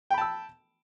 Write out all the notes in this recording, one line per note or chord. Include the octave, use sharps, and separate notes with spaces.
G5 A5 B5 E6